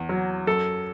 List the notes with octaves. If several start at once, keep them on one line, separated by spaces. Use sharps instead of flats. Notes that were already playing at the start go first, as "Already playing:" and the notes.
Already playing: E2
F#3
F#2 A4